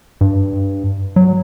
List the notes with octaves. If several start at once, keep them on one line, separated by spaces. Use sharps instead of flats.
G2
F#3